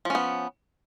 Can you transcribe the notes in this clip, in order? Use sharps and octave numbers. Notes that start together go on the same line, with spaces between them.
F3 B3 C#4